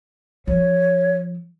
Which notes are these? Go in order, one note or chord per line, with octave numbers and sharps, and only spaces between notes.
F3 C#5